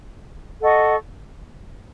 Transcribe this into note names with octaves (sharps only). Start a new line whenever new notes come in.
A4 D#5 F#5 C#6